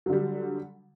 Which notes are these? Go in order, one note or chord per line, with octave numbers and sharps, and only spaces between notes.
D3 F#3 G3